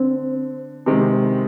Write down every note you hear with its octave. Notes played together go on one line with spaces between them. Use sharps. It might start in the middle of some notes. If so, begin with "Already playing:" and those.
Already playing: D3 C4
C3 D#3 G#3 C4